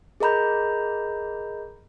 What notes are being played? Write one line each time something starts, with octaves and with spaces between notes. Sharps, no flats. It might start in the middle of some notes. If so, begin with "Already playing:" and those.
G#4 A#4 D#5 A#5 B5 G6